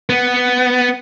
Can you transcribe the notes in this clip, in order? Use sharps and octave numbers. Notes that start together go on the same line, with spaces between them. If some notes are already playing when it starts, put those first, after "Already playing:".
B3